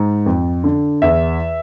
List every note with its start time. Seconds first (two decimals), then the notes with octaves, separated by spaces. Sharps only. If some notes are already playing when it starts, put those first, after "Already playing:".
Already playing: G#2
0.26 F2
0.64 D3
1.02 E2 E5